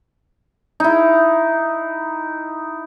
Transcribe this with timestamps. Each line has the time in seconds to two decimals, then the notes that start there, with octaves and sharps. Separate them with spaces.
0.80 D#4 E4